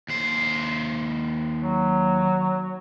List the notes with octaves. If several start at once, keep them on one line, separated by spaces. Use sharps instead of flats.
D#2 C5
F#3